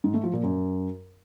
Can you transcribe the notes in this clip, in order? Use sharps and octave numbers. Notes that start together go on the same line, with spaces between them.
G#2
A3
F3
A#2
F#2